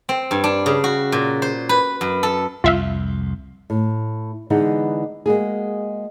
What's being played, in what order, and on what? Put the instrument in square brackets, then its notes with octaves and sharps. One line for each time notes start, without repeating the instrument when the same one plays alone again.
[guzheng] C4
G2
D4
C#3
F#4
A#2
C5
B4
F#2
A4
[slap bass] C2 F2 [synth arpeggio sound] F4 E5 F5
[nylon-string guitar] A2
D3 E3 G#3 B3 D#4
G#3 A#3 F#4 G#4